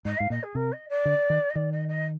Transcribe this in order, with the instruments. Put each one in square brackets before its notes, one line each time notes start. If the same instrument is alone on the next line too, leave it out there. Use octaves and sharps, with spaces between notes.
[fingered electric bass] G#2 [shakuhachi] D#5
[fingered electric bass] G#2 [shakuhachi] F5
[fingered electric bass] A#2 [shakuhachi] D#5
[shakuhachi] G#4
[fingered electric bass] C3 [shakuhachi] A#4
[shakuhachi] D#5
D5
[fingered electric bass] D3
D#3
[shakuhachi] D#5
[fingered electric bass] D#3 [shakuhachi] D5
[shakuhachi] D#5
D#5